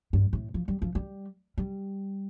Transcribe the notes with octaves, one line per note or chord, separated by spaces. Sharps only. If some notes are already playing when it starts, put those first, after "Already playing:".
G2
A2
F3
G3
F3
G3
G3